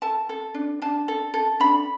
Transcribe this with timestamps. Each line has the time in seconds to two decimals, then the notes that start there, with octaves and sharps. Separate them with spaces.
0.02 A4 A5
0.29 A4
0.54 D4
0.82 D4 A5
1.08 A4
1.34 A4
1.60 D4 B5